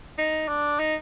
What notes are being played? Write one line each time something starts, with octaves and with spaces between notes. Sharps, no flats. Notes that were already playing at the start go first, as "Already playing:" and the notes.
D#4
D4
D#4